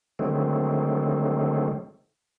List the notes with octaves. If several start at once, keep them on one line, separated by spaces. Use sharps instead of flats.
D3 D#3 F#3 G#3 A3 C4